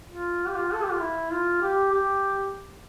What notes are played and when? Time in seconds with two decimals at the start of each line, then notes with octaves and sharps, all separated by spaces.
0.10 F4
0.47 G4
0.55 F4
0.73 A4
0.83 G4
0.91 F4
1.01 E4
1.31 F4
1.62 G4
1.92 G4